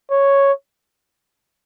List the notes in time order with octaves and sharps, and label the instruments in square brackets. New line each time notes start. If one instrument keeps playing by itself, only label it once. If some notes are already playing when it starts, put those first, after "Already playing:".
[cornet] C#5